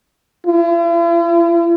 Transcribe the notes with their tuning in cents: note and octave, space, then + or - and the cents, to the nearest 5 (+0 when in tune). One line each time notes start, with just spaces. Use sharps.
E4 +45